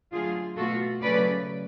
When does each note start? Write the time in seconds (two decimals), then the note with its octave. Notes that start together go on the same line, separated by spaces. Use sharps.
0.12 D3 F#3 A3 F4 G#4
0.57 B2 A3 F4 F#4 A4
1.02 C#3 F#3 A3 C#4 B4 D5